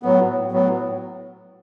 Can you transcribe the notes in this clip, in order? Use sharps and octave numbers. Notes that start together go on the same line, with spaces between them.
A2 F#3 B3
A2 F#3 B3